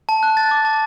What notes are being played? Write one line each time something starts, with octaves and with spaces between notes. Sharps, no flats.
A5
F#6
A6
D6
A5